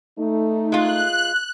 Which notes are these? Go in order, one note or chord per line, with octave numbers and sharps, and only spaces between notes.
A3 D#4
G#3 F4 F#6